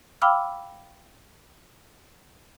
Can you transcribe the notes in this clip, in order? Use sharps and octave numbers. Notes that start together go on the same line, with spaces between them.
F5 G5 B5 D6 E6 F6